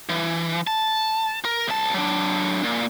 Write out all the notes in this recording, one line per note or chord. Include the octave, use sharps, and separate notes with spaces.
E3
A5
A#4
C2 A5
F#3 D4
A#2